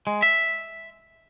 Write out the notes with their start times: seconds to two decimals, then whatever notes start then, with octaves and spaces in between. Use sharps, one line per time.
0.07 G#3
0.22 E5